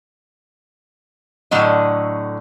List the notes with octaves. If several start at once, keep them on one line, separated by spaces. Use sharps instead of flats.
A2 D3 F#3 D#5